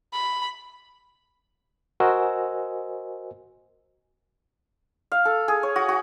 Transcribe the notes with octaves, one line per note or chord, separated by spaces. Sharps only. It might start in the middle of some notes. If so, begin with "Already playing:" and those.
B5
F#4 A#4 C5 D#5 G#5 E6
F5
A4
G#4
C#5
F#4
F#4